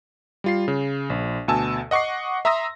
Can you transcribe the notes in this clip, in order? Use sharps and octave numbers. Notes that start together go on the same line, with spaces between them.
G3 F4 C7
C#3
A#1
D2 B2 G#5 A5 E6
D#5 F#5 C#6 D6 C7
E5 A#5 C6 D#6 E6 A#6